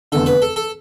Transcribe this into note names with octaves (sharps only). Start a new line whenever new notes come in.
F1 E2 D3 A4
B4
A4
A4